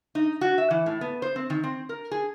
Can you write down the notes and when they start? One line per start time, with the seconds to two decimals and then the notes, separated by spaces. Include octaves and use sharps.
0.15 D#4
0.41 F#4
0.58 E5
0.71 E3
0.86 A2
1.01 B3
1.22 C5
1.36 C4
1.50 D#3
1.64 C4
1.89 A#4
2.11 G#4